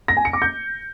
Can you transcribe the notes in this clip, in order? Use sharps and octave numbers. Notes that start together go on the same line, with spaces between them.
A#6
G#5
C#7
D6
G6